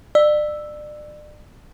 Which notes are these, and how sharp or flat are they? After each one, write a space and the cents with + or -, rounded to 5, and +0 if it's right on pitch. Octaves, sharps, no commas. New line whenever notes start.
D5 +35 E6 +0